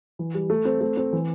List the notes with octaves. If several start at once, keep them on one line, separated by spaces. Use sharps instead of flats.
E3
G3
A3
C4
A3
C4
E3